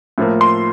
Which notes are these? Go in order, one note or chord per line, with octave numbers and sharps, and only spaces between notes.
A2 F3 A#3
C6